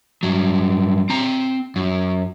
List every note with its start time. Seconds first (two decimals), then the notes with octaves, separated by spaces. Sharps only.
0.23 G2 F#3
1.10 C4 A#5
1.76 F#2